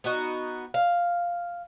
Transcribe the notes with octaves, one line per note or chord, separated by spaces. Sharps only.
B3 D#4 F#4
F5